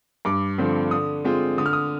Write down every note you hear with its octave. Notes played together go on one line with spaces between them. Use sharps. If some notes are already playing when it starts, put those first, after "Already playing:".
G2 D6
D3 F3 C4
D3 D#6
G#3 C4 F4
D3 D#6
F6
D#6